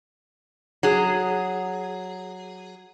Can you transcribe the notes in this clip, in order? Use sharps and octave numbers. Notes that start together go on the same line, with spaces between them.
F#3 G#4